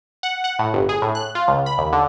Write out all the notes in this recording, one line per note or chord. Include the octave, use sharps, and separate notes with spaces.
F#5
F#5
A2
G1
G#4
A2
F#6
F4
C#2
B5
D#2
D3